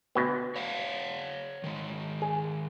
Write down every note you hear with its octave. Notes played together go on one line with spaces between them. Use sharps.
D2 B2 B3
C#5 F5 F#5
D#3 G#3
G#4